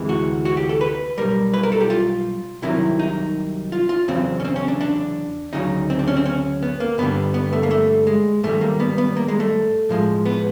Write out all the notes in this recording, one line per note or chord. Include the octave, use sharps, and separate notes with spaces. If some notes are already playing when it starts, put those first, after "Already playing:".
Already playing: D2 C3 E3 G#3
F#4
F#4
G4
A4
B4
B1 A#2 G3 A#4
B4
A#4
A4
G4
F4
C2 C3 D#3 F#3 E4
D#4
F4
F4
E2 C#3 F#3 C4
C#4
C4
C#4
D4
D4
D2 C#3 F#3 D#4
C4
D4
C#4
C4
C#4
B3
A#3
G2 D3 G3 B3
B3
A3
A#3
A3
G#3
G#2 D#3 G3 A3
A#3
B3
B3
A#3
G#3
A3
A2 F3 G#3
B3